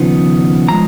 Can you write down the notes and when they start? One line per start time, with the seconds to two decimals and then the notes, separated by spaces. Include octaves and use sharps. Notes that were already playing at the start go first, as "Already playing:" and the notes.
Already playing: D#2 C#3 F3 B3 D#4
0.69 F3 G#3 A#5